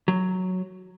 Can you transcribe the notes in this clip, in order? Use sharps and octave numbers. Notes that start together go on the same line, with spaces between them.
F#3